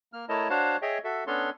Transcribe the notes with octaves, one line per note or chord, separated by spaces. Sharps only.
A#3 F6
A3 E4 A#4 C#5 D#5 A5
D4 F#4 C5 C#5 F5 A5
G#4 C#5 D#5 E5 G5
F#4 A4 E5
B3 C#4 D4 A4 C#5 C6